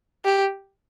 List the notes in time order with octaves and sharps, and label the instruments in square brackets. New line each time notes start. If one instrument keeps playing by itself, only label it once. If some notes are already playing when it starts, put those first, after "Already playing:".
[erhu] G4